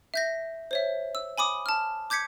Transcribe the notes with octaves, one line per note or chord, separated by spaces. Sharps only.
E5 G6 A#6
C5 C#5 E5
E6
G#5 B5 D6 D#6
A5 F6
D6 G6 G#6 B6 C#7